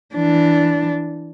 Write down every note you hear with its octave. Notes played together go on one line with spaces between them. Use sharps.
E3 D4